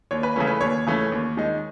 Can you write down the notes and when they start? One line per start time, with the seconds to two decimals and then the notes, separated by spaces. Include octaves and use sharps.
0.11 D#2 C#5
0.23 B4
0.36 C#3 E3 A3 C#4
0.47 B4
0.61 D#2 C#5
0.87 C#3 E3 A3 C#4
1.12 D#2
1.37 D#3 G#3 D#4